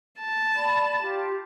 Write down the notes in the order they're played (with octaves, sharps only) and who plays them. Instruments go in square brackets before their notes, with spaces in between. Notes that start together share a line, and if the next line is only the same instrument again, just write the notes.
[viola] A5
[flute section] D5 B5
F4 G4